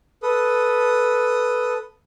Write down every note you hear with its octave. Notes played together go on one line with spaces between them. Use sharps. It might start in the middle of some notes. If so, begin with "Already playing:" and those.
A4 B4 D#6